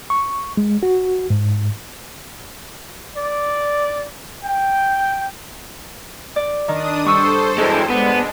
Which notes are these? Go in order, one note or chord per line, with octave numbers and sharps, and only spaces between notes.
C#6
G#3
F#4
G#2
D5
G5
D5
D#3 D4 D#6
G2 A4 C5 C#6 E6
E3 G#3
G#3 B3 D4